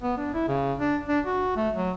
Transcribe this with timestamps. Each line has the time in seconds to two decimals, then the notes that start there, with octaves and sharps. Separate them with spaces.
0.02 B3
0.18 D4
0.34 E4
0.48 C#3
0.79 D4
1.08 D4
1.25 F#4
1.57 A3
1.75 F#3